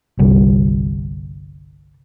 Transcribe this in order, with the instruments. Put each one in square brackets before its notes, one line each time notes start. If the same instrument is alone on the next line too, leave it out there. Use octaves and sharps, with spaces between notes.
[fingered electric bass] G1 C2 G3